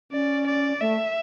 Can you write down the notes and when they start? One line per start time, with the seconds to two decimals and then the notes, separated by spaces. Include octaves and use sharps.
0.11 C#4 D5
0.47 D5
0.81 A3 E5